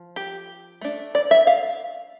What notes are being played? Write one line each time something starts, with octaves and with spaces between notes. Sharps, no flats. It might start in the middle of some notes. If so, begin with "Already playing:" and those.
Already playing: F3
G4
A3 D4
D5
E5
F5